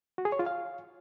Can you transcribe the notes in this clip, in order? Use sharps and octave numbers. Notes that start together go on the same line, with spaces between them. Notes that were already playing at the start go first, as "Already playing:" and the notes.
F#4
G#4
C#5
F4
F5